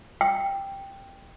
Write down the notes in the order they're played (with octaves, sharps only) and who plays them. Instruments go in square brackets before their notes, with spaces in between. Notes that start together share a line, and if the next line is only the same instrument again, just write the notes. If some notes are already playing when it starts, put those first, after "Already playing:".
[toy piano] G5